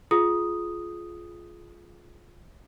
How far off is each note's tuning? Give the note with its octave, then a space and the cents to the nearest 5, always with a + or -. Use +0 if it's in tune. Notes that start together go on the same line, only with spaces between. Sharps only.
F4 +0 G#4 +20 D#6 +0